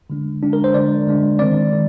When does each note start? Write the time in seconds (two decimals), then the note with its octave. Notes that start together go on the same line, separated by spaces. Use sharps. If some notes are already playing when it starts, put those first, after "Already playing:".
0.10 D3 G#3 D4
0.43 D3 G#3 D4
0.53 A#4
0.64 C5
0.74 D3 G#3 D4 D5
1.07 D3 G#3 D4
1.39 D#3 G#3 C4 D5
1.72 D#3